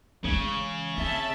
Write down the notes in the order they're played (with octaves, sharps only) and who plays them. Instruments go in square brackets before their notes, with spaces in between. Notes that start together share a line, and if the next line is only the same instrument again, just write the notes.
[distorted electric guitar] C#3 [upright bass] E3 G#3
[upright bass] C4 [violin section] E5 A5